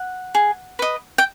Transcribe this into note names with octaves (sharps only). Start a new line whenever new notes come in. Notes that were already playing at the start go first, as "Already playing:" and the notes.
Already playing: F#5
G#4
B4 D#5
G5